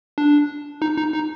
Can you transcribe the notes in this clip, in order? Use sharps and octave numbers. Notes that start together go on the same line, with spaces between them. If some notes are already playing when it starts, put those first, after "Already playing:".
D4
D#4
D#4
D#4